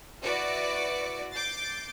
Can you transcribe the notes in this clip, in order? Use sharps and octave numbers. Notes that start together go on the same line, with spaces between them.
E4 F#4 B4 D5 D6 C#7
D6 G6 A6 C7